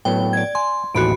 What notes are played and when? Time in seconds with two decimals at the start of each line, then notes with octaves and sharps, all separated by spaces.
0.05 A2 F#3 B3 G5
0.33 D5 G#6
0.55 G#5 C6
0.95 A1 D#2 A2 F#4 B5 D7